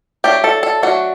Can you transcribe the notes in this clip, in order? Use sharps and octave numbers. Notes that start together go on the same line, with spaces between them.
F#3 A3 D4 G4
A4
A4
F#3 A3 D4 F#4